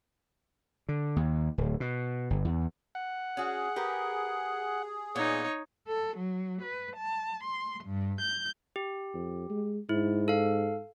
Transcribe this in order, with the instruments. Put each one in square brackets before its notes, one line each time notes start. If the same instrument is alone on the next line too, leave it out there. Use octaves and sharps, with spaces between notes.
[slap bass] D3
D#2
D1
B2
G1
E2
[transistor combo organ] F#5
[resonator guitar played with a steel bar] C#4 F#4 [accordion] G#4
[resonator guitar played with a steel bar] G4 A#4 B4
[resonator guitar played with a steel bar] A#2 B3 [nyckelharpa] D#4 C#5
[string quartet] A4
F#3
B4
A5
C6
G2
G6
[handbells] G4
[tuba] F2
G#3
[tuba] G#2 [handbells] E4
[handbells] A4 F5